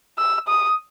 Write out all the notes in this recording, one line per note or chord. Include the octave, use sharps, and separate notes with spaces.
E6
D#6